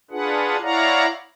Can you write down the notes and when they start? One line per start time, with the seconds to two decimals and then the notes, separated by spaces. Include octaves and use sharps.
0.11 D4 F4 G#4 B4 F#5
0.62 E4 C#5 D5 F5 F#5 A#5